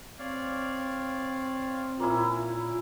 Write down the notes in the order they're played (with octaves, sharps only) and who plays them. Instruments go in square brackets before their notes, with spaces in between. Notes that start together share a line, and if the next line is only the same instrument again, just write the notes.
[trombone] C4 [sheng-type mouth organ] C#5 D5 F5
[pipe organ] A#2 [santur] A#3 C#4 E4